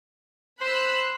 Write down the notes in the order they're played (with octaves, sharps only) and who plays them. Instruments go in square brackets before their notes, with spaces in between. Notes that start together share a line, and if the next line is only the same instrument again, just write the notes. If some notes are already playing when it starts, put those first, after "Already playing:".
[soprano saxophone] C5 [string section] B5 E6 F#6